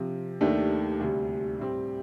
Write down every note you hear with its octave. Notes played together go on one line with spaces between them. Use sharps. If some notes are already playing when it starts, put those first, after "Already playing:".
Already playing: C3 F3 C4
D#2 D#3 A3 D4 G4
D2 C3 G3
A2 G3 C4 G4